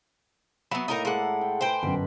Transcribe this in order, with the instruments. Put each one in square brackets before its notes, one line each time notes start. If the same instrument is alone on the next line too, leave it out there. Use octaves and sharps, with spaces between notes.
[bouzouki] F#3 B3 [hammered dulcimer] E5 [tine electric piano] B5
[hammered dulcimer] A2 A#3 [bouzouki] D#4 A#4 A#5
[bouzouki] G#3 F#5 [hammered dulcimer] A4 D5
[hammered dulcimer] G5
[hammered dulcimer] B4 G#5 C6 [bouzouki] C5 G5
[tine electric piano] G1 F#2 [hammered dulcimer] B2 B4